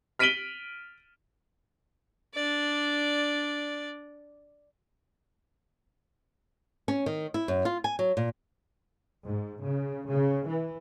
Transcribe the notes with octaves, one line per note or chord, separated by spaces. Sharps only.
F6 B6 D7 D#7 F#7 G7
D4 D5
C#4
D#3
E4
F#2
F4
G#5
F#3
A#2
G#2
C#3
C#3
E3